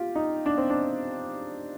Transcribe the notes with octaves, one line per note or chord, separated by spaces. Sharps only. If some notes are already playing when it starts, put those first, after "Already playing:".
Already playing: F4 G4
D#4
D4
C4
D4